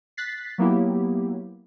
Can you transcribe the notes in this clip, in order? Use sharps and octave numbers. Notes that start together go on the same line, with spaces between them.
F#6 A6 B6 C7
F#3 A#3 B3 E4 G4